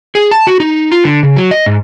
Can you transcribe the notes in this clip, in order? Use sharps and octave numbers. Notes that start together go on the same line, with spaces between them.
G#4
A5
F#4
D#4
F4
D3
C#3
F#3
D#5
G#2